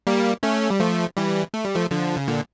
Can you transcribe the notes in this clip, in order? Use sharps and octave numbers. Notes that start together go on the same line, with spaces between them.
G3 A#3
A3 C#4
G3
F3 A3
E3 G3
A3
G3
F3 A3
D3 F3
C#3
A#2 D3